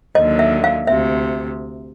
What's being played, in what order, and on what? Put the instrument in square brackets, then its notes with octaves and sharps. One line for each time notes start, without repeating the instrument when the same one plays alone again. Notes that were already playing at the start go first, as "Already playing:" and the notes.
[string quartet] D#2 D3 F#3 [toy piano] D#5
[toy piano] E5
F5
[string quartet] D2 C3 [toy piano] E5